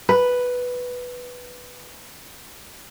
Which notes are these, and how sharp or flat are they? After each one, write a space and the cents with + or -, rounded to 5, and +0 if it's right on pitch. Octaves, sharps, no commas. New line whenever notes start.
B4 +0